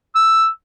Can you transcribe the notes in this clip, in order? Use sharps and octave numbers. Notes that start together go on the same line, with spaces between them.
E6